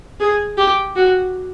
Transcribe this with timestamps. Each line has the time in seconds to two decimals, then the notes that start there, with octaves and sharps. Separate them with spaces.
0.20 G#4
0.57 G4
0.96 F#4